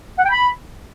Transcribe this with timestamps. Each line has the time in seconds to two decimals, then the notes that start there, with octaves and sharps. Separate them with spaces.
0.18 F#5
0.24 G5
0.30 B5